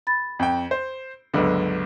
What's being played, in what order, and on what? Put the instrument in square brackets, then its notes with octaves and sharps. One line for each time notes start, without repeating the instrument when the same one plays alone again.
[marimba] B5 A6
[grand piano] F2 G5
C5
[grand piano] G1 C#2 D3 [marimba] F#3 B4